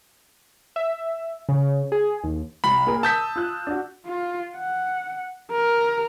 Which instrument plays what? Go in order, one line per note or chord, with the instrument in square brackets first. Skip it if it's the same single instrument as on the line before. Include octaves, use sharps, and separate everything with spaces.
[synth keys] E5
C#3
G#4
D#2
[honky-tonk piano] C2 [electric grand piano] B5
[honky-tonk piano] A#3 G#4 A#4
[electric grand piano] A5 G6 B6 [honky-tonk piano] D#6 E6
[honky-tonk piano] F4 F#6
D4 F#4
[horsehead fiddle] F4
F#5
A#4